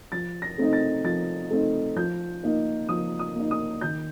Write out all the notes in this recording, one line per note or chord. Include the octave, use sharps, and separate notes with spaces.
F3 A6
A#6
A3 C4 D#4
A6
F3 A6
A3 C4 D#4
F3 G6
A#3 D#4
F3 D#6
D#6
A#3 D#4
D#6
D#3 G6